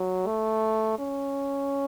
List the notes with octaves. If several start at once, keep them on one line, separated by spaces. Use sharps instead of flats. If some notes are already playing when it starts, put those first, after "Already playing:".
Already playing: F#3
A3
C#4